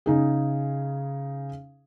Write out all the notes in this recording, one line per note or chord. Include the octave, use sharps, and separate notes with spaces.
C#3 D#4 G#4